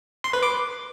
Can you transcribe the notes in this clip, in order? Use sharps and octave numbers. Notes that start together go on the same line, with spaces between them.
C6
B4
D6